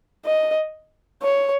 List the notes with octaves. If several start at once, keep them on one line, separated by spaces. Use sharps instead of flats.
D#5
C#5